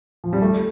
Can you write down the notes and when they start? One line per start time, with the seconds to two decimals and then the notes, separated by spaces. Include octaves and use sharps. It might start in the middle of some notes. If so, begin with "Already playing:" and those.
0.24 F3
0.33 G3
0.42 A3